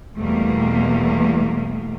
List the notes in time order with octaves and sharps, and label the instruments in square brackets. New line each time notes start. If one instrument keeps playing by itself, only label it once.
[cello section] E2 B2 G3 A3 A#3